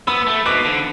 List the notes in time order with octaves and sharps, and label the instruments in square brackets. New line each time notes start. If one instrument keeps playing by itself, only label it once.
[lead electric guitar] B3 [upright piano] B5 E6
[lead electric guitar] A3
[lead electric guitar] B2 [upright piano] D6 F#6
[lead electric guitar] D3